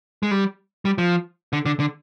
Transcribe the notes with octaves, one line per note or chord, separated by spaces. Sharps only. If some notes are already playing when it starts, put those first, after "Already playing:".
G#3
G3
G3
F3
D3
D3
D3